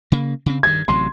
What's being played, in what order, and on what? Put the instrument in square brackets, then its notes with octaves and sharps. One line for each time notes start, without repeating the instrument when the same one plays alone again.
[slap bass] C#3 A#3
C#3 C4
[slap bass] G2 D#3 [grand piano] G#6
[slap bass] A1 C3 F#3 [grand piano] C6